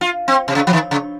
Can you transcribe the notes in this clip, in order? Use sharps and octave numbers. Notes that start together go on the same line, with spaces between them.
F4
C4
C3
C#3
F3
D#3
C#3